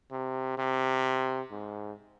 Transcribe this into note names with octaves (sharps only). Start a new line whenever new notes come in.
C3
C3
G#2